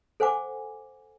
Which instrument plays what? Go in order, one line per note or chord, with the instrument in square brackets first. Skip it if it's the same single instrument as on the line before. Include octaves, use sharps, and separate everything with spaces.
[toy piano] A4 C5 F#5 G#5 D6